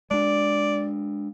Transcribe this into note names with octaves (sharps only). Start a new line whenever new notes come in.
G#3 D4 D5